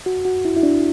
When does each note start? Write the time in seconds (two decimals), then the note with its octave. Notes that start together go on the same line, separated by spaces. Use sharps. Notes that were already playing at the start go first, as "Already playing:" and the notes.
0.06 F#4
0.25 F#4
0.45 E4
0.56 E4
0.63 D4